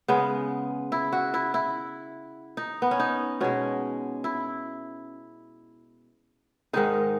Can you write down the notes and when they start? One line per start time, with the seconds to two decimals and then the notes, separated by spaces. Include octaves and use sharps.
0.08 C#3 G#3 B3
0.92 E4
1.13 F#4
1.34 E4
1.54 E4
2.57 D#4
2.82 B3
2.91 C#4
3.00 D#4
3.41 B2 G#3 C#4
4.24 E4
6.73 G#2 D#3 G#3 D#4